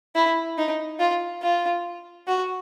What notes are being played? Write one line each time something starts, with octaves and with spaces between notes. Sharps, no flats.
E4
D#4
F4
F4
F#4